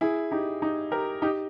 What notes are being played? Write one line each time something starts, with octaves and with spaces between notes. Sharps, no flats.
E4 G#4
D#4 G4
D#4 G4
G4 A#4
D#4 G4